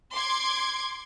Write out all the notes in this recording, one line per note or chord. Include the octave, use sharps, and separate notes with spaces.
C6 D6 G#6